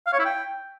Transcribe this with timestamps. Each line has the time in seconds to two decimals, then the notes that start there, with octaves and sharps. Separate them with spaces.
0.07 F5
0.13 C#5
0.19 E4
0.25 G5